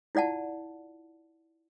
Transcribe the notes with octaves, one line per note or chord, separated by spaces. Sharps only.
E4 F4 D5 F#5 A5